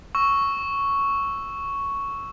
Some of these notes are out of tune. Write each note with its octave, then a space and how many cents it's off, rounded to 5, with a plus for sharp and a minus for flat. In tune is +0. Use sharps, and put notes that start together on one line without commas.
C#6 +0 E6 +0